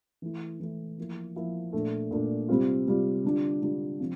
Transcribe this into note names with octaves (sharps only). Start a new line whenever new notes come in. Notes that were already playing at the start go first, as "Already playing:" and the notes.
E3 A3 E4
E3 A3 E4
F3 A#3 E4
F3 A#3 E4
A#2 A3 D4
A#2 A3 D4
C3 G3 C4 F4
C3 G3 C4 F4
D3 G3 D4 F4
D3 G3 D4 F4
C3 F3 C4